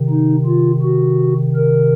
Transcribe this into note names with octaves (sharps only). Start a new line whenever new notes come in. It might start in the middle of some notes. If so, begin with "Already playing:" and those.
Already playing: C3 D#3
D#4
F4
F#4
A#4